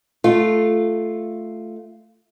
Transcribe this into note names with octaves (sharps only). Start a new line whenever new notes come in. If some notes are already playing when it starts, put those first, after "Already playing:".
A3 F4